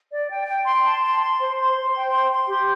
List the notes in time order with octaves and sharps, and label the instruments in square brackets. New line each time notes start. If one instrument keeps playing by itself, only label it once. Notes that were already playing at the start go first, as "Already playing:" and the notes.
[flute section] D5
G5
G5
C6
A5
C6
C6
C5
C6
C5
G5
C6
C6
G4